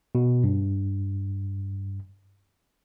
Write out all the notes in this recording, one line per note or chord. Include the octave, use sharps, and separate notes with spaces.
B2
G2